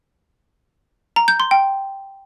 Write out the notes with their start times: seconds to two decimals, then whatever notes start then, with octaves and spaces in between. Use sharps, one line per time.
1.16 A#5
1.28 G6
1.40 C6
1.51 G5